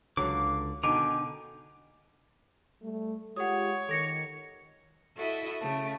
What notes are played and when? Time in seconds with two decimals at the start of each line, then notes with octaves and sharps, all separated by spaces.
0.17 C#2 D3 F#3 F5 D6
0.83 B2 D3 D#3 G5 G#5 A#5 D6
2.82 G3 A3
3.36 G#3 F4 G4 C#5 F#5 D#6
3.89 D#3 A4 A#6 C#7
5.16 E4 F#4 A4 D#5 E5
5.60 C#3 A3